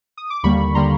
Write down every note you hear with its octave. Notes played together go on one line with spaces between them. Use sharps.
D#6
D6
D#2 D3 G3 A#3 B5 C#6
D3 G3 A#3 A#5 C6